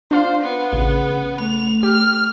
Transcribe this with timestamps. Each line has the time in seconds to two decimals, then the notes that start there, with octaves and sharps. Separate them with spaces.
0.11 D4 F4 C5 F5
0.41 B3
0.73 A1 C#3
1.40 A3 F7
1.83 G4 F6